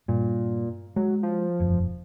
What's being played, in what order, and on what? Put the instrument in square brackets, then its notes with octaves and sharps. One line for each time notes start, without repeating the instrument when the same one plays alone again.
[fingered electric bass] G2 [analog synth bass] A#2
[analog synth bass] F#3 [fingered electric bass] G#3
[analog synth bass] F3
[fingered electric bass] E1 F#2